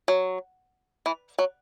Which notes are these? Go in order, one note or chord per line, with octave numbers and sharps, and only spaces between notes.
F#3
E3
F#3